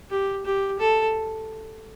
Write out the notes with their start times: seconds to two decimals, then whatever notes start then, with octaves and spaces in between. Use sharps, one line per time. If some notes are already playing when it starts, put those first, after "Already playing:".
0.11 G4
0.46 G4
0.80 A4